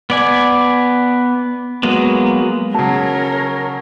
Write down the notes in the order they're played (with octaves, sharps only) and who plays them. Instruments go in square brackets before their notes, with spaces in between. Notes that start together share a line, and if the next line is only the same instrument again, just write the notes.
[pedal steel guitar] B3 D5 G#5
F#3 G#3 A#3 B3
[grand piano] C#3 F#3 [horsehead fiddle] A#4 C#5 [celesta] A5